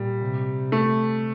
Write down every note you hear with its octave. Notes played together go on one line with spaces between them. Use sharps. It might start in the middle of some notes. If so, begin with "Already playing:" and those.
Already playing: A#2 G3
C3
A3